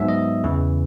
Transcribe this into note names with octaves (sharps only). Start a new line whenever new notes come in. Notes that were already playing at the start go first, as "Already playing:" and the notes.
Already playing: G#2 F#3 B3 E5
D#5
E2 C#3 E3